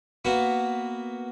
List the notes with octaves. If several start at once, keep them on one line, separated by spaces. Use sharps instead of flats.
A#3 B3 F#4